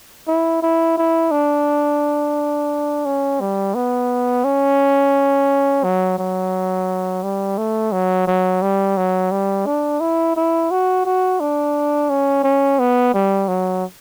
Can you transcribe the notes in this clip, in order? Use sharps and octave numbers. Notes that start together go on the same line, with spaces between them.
E4
E4
E4
D4
C#4
G3
B3
C#4
F#3
F#3
G3
A3
F#3
F#3
G3
F#3
G3
D4
E4
E4
F#4
F#4
D4
C#4
C#4
B3
G3
F#3